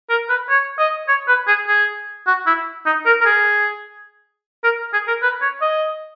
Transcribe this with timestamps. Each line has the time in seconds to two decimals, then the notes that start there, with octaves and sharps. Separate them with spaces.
0.10 A#4
0.30 B4
0.50 C#5
0.79 D#5
1.08 C#5
1.28 B4
1.48 G#4
1.68 G#4
2.27 F#4
2.46 E4
2.86 D#4
3.06 A#4
3.21 A#4
3.25 G#4
4.64 A#4
4.93 G#4
5.08 A#4
5.22 B4
5.42 C#5
5.62 D#5